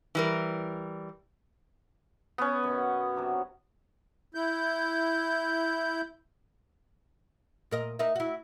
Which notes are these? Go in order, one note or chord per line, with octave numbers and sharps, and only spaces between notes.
E3 G3 A#4
B3 C#4 B4
F#2 B2
C3 F#3 D4
E4 G6
A#2 A#4 D#5
D#4 A#4 E5
E4 F#4